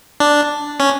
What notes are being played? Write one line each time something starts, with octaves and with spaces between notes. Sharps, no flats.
D4
C#4